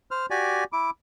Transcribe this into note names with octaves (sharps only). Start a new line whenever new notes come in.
C5 F6
F#4 G4 D5 G#5
E4 D6